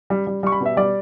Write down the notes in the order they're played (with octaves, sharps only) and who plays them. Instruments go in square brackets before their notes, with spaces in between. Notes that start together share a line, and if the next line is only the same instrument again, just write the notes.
[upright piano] G3
G3
G3 C#6
B5
B2
E5
G3 D5